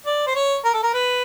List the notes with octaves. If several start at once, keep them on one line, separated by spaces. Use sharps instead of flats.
D5
C5
C#5
A#4
A4
A#4
B4